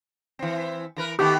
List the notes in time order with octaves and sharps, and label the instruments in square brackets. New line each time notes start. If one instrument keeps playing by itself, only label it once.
[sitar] E3 C4
E3 A#4 B4
[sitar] D#3 A3 B3 [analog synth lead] G4